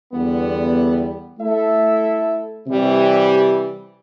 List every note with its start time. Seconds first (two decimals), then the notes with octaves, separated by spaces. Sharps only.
0.13 E2 D3 G3 B3
1.39 A3 E4 A4 E5
2.67 C3 E3 G3